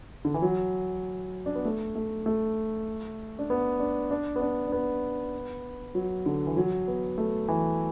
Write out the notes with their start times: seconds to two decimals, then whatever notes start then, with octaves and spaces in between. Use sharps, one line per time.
0.25 D3
0.34 E3
0.42 F#3
1.46 D4
1.55 B3
1.65 A3
1.95 A3
2.26 A3
3.39 D4
3.50 B3
3.80 D4
4.11 D4
4.36 B3
4.41 D4
4.67 D4
4.72 B3
5.95 F#3
6.26 D3
6.47 E3
6.57 F#3
6.88 B3
7.18 A3
7.48 E3